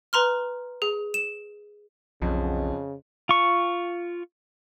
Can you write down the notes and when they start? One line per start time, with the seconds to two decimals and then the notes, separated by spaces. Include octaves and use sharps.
0.13 B4 A#5 C6 F6
0.82 G#4
1.14 E7
2.22 B1 F2 C#3
3.29 F4 C#6